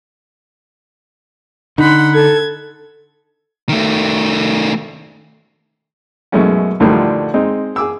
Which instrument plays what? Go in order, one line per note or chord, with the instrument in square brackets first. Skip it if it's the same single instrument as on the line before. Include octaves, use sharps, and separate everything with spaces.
[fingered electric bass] D3 [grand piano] D#4 [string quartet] F#5 B5 C6
[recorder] A4 [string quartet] G#6
[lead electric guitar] D#3 A3
[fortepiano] F#2 B2 G#3 A3 C#4 E4
D2 A2 D3 D#3 F3 G3
G#3 C4 D#4
G#4 D6 E6